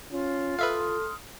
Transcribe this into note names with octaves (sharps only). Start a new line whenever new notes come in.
C#4 F4
A4 B4 E5 F5 C6 D#6 F6